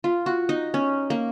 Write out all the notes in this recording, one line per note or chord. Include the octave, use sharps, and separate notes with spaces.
F4
F#4
D#4
C#4
A#3